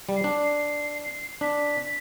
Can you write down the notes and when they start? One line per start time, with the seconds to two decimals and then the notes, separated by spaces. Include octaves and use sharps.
0.09 G3
0.16 C7
0.24 D4
0.42 C7
1.41 D4 B6